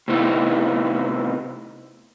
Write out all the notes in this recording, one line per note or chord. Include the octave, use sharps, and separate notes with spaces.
A2 C3 B3 D#4 E4